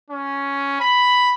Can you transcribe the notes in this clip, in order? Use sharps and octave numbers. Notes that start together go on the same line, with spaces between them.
C#4
B5